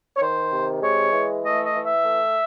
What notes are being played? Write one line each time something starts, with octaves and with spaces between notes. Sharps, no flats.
C#5
D#3 C5
C3
G#3 C#5
E3
A3 D#5
D#5
E3
E5
A3